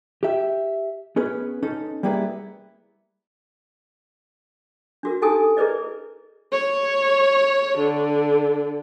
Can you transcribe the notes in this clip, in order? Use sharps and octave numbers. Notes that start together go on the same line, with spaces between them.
G4 E5
B3 C#4 G#4 B4
C#4 D#4 A4
G3 A#3 B3 E4 G#4 B4
D4 F#4 A#4
D#4 G4 A4 G#5 A5 D#6
E4 G#4 A#4 B4 D5 D#5
C#5
D3